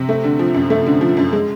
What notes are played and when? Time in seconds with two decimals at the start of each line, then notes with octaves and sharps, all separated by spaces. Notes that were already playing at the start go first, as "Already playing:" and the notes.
Already playing: C3
0.09 A3
0.24 D3
0.39 F3
0.54 F#2
0.70 A3
0.87 D3
1.01 F3
1.17 F#2
1.33 G#3